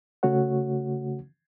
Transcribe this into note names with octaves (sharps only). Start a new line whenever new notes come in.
C#3 A3 F#4 C#5 F#5